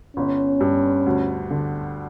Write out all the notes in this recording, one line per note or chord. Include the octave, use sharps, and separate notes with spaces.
G1 C#4
G2
D2
D3